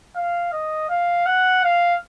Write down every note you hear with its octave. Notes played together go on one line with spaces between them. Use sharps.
F5
D#5
F5
F#5
F5